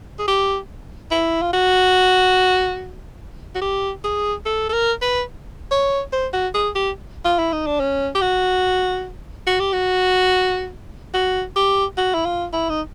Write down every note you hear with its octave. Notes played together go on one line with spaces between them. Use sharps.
G#4
G4
E4
F4
F#4
F#4
G4
G#4
A4
A4
A#4
B4
C#5
C5
F#4
G#4
G4
F4
E4
D#4
D4
C#4
G4
F#4
F#4
G4
F#4
F#4
G4
F#4
E4
F4
E4
D#4